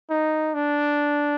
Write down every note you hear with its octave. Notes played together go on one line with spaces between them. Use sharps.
D#4
D4